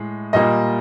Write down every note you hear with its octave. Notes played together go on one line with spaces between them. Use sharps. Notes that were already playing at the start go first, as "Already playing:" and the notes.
Already playing: A2 G#3
A#2 G3 A#3 D#5